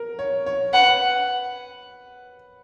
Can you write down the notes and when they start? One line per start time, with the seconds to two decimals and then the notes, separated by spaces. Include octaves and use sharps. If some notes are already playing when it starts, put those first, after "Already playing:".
Already playing: A#4
0.19 C#5
0.46 C#5
0.74 B4 F#5